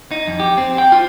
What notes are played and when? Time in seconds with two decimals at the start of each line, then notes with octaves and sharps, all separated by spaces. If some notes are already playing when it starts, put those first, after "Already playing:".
0.11 D#4
0.28 F2
0.40 G4
0.58 C4
0.78 G5
0.92 F4